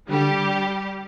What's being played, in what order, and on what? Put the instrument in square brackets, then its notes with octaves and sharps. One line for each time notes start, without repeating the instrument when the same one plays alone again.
[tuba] D3 [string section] G3 G4